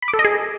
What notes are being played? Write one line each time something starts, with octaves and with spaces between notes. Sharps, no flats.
B5
D6
A4
D#5
G#4